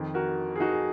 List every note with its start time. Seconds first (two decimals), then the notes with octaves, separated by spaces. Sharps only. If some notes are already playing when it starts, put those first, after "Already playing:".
Already playing: F2 D#3
0.14 F#4 A#4
0.56 G#4
0.60 D#4 F#4
0.73 G#4